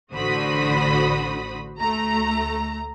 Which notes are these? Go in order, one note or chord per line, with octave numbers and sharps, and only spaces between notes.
A1 D3 F#4 C5 B5 D#6
D2 A3 A#5